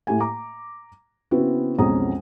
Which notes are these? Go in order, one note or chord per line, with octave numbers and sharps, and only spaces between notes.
A2 G4 G#5
A#5 D6
C#3 B3 C4 E4 F#4
B1 F2 G#3 C#4 A#5 D#6